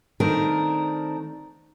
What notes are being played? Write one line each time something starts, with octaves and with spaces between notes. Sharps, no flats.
D#3 A3 C4 D4 A#4